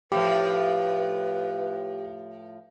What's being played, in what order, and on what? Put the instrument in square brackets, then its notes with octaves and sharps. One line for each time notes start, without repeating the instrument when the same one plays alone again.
[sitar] A2 F3 [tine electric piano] G4 [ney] B4